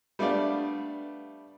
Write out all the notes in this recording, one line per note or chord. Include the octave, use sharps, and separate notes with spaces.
G3 A3 B3 D4 D5 F5